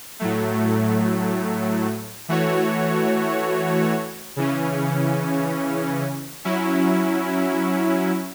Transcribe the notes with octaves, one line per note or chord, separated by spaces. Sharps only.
A2 F#3 A3
E3 A3 F#4 C#5
C#3 E3 C#4
F#3 C#4 E4